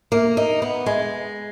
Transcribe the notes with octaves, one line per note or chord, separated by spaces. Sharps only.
A#3
D#4
B3
G#3